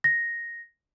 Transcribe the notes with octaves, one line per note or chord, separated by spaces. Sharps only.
A#6